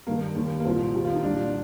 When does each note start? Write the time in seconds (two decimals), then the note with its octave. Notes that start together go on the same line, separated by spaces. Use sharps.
0.07 G2 D#3 G3 A#3
0.21 A#3
0.36 D#2 D#3 G3
0.60 A#3
0.65 C2 A#2 F3 C4
0.95 F2 D#3 G3
1.04 F4
1.15 D#4
1.23 C2 A#2 G3 D4